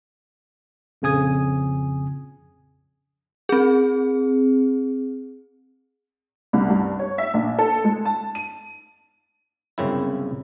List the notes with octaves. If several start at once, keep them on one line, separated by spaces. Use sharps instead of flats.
A#1 F2 C#3 G#5 D#6 G#6
C4 G#4
C2
G2
C#5
E5
A#1
A4
G#3
A5
D#7
G1 C2 F#2 C#3 C4 E4